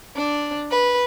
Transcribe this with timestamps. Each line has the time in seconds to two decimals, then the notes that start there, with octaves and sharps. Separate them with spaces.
0.16 D4
0.71 B4